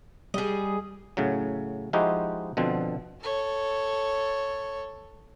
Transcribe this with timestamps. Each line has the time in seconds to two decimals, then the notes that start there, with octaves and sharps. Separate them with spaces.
0.34 G3 G#4 D#5
1.17 A2 C#3 F#3
1.93 F3 G#3 D#4 E4 F#4 G4
2.57 B2 D3 F3 C4
3.22 A4 C#5